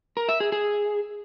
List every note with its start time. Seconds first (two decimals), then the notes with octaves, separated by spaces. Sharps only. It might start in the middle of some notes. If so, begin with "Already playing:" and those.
0.17 A#4
0.29 E5
0.40 G#4
0.52 G#4